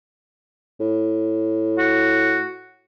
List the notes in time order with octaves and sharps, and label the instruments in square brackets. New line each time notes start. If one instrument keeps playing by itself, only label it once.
[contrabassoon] A2
[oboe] F#4